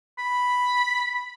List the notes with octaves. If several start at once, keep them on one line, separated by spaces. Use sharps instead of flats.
B5